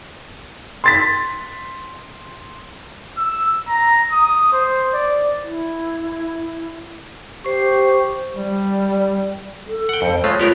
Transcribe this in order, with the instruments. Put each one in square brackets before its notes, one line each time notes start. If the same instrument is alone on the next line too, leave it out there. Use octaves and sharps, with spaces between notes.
[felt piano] C6 A6 B6
[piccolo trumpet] E6
A#5
D#6
C5
D5
[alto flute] E4
[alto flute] G4 [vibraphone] C5 C#6
[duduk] G3
[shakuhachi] A4
[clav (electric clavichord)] F#5 G5
[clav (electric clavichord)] F2 [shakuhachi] C5
[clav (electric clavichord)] G#3 A3 F4 [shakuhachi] C#5
[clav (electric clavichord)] B3 G4 A#4 [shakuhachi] F4